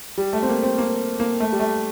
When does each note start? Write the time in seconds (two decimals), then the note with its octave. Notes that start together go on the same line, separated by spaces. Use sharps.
0.17 G3
0.33 A3
0.43 C4
0.49 A#3
0.63 C4
0.78 A#3
1.20 A#3
1.40 A3
1.52 G3
1.60 A3